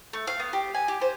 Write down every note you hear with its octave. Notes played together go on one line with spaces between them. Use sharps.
A3
F5
B3
G4
G#5
G4
C5